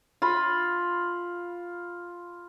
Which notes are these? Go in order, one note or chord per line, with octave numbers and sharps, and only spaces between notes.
F4 B5